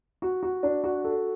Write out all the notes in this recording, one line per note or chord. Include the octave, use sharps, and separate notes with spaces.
F#4
F#4
D4
F#4
A4